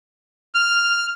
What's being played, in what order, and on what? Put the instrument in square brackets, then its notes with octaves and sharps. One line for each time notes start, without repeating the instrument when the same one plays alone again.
[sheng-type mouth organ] F6